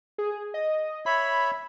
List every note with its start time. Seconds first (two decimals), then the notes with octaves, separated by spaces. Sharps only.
0.18 G#4
0.54 D#5
1.06 C#5 E5 B5